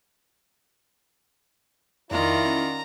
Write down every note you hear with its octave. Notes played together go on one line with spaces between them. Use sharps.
F2 D#3 E4 F4 D5 A#5
C#4 F#5